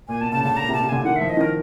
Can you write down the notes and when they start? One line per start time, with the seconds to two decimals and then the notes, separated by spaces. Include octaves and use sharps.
0.08 A#2 G#5
0.21 B2 A5
0.32 C#3 A5
0.44 D3 A5
0.57 A#2 A#5
0.69 C3
0.73 A5
0.80 C3
0.89 D3 G#5
1.04 D#3 F#5
1.16 F3 E5
1.29 D#5
1.37 D#3 A#4